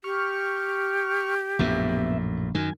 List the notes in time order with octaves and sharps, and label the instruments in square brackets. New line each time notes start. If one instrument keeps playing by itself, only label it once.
[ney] G4 [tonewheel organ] C#6 F6
[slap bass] A#1 F#2 A2 [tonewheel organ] B3 E5
[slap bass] F#2 D#3 [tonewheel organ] F#3 G#5